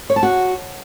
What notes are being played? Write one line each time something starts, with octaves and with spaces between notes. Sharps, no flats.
C#5
A5
F#4